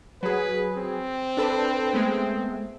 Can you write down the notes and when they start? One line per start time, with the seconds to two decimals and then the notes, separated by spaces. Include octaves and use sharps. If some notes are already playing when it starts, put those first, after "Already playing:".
0.23 F#3 G#4 B4
0.77 C4
1.37 D4 A4 B4
1.93 G#3 A3 B3